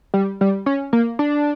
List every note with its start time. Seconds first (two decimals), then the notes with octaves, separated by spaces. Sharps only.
0.14 G3
0.41 G3
0.66 C#4
0.93 A#3
1.19 D4